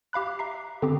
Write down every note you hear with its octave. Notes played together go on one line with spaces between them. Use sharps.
G4 F5 B5 F#6
E5 A#5 C7
D3 C4 G4 D6